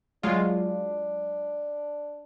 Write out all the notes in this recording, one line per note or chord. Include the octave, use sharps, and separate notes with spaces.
F#3 G#3 D4 F4